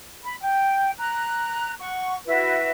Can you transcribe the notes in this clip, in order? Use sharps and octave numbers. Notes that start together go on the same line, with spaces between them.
B5
G5
A#5 F#6
F#5 C#6
E4 F#4 B4 E5